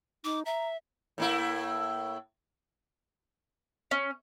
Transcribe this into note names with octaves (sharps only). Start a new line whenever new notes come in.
D#4 D6
E5 A#5
A2 A#3 E4
C#4